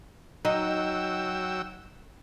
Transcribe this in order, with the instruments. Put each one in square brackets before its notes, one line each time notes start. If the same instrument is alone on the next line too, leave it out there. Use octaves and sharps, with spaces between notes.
[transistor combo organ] F#3 G5 E6 [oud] D#4